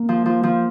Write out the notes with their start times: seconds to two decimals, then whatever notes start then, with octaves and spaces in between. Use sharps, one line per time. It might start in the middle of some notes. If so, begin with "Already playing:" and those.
Already playing: A#3
0.09 F3
0.26 F3
0.43 F3